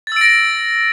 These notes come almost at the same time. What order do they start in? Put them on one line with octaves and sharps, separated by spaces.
A6 E6 D7 A#6